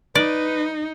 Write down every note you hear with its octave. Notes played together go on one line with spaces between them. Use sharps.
D#4 B4 D5